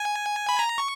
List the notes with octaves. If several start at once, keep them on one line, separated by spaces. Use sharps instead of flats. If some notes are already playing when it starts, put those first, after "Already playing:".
Already playing: G#5
B5
A#5
C#6